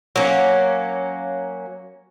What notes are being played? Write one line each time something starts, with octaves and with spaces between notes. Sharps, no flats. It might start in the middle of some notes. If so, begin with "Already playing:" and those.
F#3 A#3 C#4